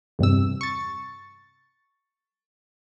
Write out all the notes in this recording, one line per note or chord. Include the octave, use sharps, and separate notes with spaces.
E2 G2 C3 E6
C#6 A6